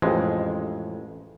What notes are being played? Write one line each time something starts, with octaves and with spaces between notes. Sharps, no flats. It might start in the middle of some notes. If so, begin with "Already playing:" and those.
A1 F2 G#3